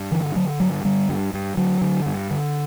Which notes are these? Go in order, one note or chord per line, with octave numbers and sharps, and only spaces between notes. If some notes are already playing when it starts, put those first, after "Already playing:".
Already playing: G2
D3 E3
D3 F#3
G2 F#3
D3 G3
G2
G2
D3 F#3
D3
G2
D3